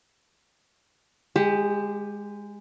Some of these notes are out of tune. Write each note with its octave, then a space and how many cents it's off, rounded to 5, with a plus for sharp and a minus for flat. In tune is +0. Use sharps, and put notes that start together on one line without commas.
G#3 -15 G4 +15